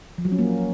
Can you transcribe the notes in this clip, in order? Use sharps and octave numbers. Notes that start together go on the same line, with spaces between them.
F3
F#3
C#4
A#3